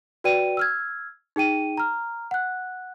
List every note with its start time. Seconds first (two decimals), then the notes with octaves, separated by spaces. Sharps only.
0.24 F#4 B4 D5 G5 D#7
0.57 E6 F6 G#6
1.36 D#4 G#4 G5 D#7
1.77 A#5 F6
2.31 F#5 F#6